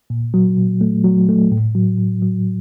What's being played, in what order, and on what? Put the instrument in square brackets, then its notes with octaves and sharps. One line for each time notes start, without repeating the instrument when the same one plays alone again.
[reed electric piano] A#2
F#3
A#2
A3
F#3
A3
A2
F#3
A2
F#3